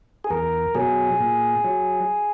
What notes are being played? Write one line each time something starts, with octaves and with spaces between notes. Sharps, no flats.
G#4
E2 A#4
B2 F#3 G#4
A#2
F#3